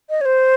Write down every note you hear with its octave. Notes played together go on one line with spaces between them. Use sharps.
D#5
C#5
C5